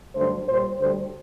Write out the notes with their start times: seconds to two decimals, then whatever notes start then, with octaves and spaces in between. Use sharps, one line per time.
0.14 G2 D3 F#3 A3 C5
0.46 A#2 G3 C5
0.78 D2 D3 G3 C5